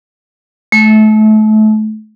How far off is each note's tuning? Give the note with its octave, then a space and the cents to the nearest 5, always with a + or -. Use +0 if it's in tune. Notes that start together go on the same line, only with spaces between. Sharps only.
A3 -30